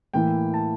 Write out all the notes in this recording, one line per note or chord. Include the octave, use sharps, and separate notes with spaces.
A2 E3 A#3 E4 G5
A5